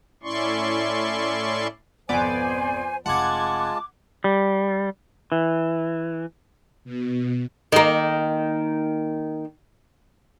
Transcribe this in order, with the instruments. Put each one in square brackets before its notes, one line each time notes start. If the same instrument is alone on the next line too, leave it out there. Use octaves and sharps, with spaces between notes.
[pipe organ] A2 C#4 E4 D5 C6 C#6
[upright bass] G#1 B2 [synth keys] F2 B3 D5 [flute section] C5 G#5
[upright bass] F1 C4 [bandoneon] G#3 F4 A5 [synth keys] F#5 G#6 [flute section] D6
[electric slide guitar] G3
E3
[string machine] B2
[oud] D#3 A#3